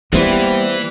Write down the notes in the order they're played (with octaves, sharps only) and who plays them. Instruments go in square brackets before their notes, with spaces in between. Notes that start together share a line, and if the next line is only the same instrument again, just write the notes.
[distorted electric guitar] E3 [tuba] G3 [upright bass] A#3 [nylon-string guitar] B3 E4 C5